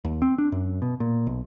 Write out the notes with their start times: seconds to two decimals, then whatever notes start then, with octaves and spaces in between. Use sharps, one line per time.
0.05 D#2
0.22 C4
0.38 D4
0.52 F#2
0.82 B2
1.00 A#2
1.27 B1